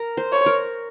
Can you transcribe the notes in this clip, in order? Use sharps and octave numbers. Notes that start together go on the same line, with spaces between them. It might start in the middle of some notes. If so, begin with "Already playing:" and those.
Already playing: A#4
C5
C#5
A#4